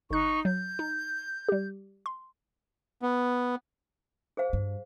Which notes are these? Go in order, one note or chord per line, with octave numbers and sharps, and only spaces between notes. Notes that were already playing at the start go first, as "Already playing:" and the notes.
G1 D#4 C#6 F#6
F#3 G6
D#4
G3 G4
C6
B3
G#4 C5 F5
G2